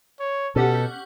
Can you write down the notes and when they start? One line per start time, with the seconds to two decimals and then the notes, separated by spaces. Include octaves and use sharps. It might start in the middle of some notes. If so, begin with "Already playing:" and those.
0.20 C#5
0.56 B2 C#4 G4 A4 F#5